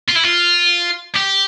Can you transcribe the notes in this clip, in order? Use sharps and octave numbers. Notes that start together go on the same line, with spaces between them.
F4
E4
F4
G4